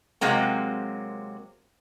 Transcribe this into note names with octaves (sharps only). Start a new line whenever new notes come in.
C3 F#3 G#3 A#3 C4